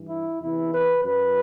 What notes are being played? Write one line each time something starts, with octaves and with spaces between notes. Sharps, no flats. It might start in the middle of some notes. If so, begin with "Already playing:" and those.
Already playing: G2 E3
E4
E2 C3 E3 E4
B4
F#2 F#3 B4